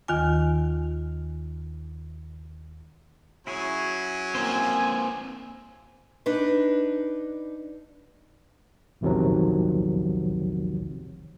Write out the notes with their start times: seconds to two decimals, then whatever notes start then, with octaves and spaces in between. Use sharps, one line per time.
0.08 D#2 D#3 F4 G#5
3.47 F#3 C#4 E4 G#4 C#5
4.35 A#3 C4 F4 C5 G#5
6.26 D4 D#4 B4
9.01 A#1 E2 C3 D#3 F3 F#3